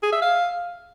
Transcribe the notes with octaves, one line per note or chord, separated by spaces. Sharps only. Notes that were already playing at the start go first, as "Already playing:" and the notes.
G#4
E5
F5